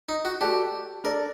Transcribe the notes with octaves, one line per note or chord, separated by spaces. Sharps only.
D#4
F#4
F#4 G4 A4 D5 A5
D4 A4 A#4 D5